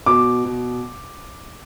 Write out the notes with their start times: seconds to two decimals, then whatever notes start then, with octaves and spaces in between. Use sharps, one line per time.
0.06 B2 D6
0.45 B2